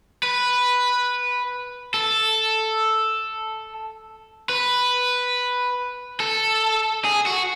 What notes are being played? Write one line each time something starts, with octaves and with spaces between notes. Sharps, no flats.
B4
A4
B4
A4
G#4
F#4